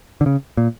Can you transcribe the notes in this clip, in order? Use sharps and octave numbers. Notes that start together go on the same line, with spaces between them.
D3
C#3
A#2